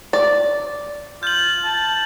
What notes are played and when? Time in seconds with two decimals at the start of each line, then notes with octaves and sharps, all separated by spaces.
0.13 D5
1.23 F4 G6 F#7
1.64 A5